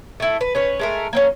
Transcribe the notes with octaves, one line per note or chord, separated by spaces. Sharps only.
A3 E4
B4
C#4 B4 C#5
G#3 A3 A#4
A#3 C4 C#4